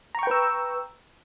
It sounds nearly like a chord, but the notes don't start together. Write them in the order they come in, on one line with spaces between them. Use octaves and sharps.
A#5 C#6 G5 B4 E6